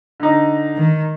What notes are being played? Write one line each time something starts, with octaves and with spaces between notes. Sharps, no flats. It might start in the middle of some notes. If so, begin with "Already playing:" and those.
D3 D#4
D#3